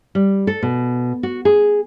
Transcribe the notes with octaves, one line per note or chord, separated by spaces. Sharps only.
G3
A4
B2
F#4
G#4